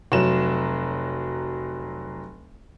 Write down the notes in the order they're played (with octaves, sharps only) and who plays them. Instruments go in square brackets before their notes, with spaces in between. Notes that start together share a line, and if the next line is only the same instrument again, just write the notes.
[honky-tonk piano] F1 F#3 E7